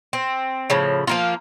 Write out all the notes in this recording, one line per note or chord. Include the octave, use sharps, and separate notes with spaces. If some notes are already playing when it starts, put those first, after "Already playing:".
C4
A2 C#3 F3
F3 A#3 F4